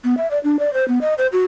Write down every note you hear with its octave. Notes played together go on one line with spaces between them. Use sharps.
B3
E5
D5
D4
D5
C5
B3
D#5
C5
F#4